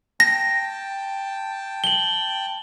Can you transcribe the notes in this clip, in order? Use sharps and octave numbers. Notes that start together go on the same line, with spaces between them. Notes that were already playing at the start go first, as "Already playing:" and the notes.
G5 A5 A#6
F#7 G7